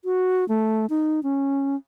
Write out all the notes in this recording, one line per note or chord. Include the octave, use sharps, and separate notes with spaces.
F#4
A3
D#4
C#4